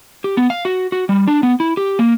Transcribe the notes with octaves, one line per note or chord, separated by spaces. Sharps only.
G4
B3
F5
F#4
F#4
G3
D4
B3
E4
G4
A#3